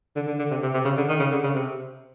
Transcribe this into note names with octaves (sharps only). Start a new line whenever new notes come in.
D3
D3
D3
C3
C3
C3
C#3
D3
D#3
C#3
D3
C#3
C3